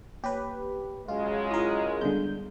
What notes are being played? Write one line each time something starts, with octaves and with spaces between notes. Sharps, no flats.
A#3 G4 B4 C#5
C#3 F#3 G#3 F4
E4 F4 A#4 D#6
D3 G3 B3 G#4 G6